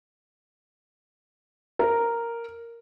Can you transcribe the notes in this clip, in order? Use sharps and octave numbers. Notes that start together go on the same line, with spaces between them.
A#4